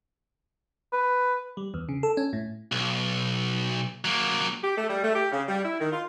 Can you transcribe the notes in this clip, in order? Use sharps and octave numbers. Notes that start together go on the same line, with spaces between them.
B4
G3
E2
C#3
A4
C#4
A2
B1
F#3 A#3
G4
A3
G3
A3
G4
C#3
G3
E4
D#3
F4